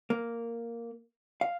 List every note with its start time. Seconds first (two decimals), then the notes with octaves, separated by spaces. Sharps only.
0.10 A#3
1.41 F5